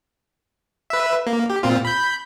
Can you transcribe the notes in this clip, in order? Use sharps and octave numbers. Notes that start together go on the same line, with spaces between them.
B4 E5
A#3
G4
A#2 C4 F4
B5 G6